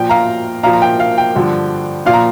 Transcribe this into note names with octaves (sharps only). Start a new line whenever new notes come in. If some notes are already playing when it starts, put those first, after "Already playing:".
Already playing: A#2 F3 G5
F5 A#5
A#2 F3 F5 A#5
A#5
G5
F5
G5
G2 D3 F3
A#2 F3 F5
A#5